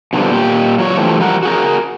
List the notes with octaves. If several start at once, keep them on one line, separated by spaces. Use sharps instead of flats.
B2 D3 D#3 F3 G3
A#2 G4
F#3 F4 C#5
D3 E3 F3 A3 G4
F3 G3 A#4 F#5
F#4 G#4 A#4